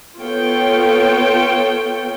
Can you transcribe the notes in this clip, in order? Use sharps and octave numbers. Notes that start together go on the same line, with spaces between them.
B3 F4 A4 C#5 G5